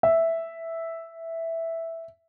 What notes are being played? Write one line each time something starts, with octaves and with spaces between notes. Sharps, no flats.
E5